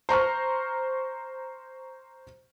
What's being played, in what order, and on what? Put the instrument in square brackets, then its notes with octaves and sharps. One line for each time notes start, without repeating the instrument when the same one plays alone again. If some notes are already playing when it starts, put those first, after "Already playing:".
[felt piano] C5 A#5 C#6 F6